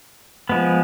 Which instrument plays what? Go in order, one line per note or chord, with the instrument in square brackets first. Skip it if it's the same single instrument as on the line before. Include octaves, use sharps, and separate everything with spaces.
[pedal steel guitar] F3 G#3 B3